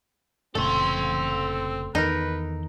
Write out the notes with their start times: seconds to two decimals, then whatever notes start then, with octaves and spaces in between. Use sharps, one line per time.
0.55 F1 A#2 C#3 A3 C4 A4 C6
1.95 E2 D#3 D#4 A#4 B4